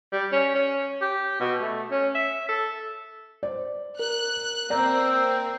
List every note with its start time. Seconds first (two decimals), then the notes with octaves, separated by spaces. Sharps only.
0.12 G3
0.32 C#4
0.55 C#4
1.02 G4
1.40 B2
1.61 A3
1.91 C#4
2.15 E5
2.49 A4
3.43 C5 D5
3.99 A#4 F#6
4.70 A#3 C4 D5 A#5 E6 G6